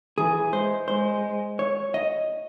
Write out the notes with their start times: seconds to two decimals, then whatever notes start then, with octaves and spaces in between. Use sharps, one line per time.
0.18 E3 G#4
0.52 G#3 C5
0.88 G#3 C5
1.59 C#5
1.94 D#5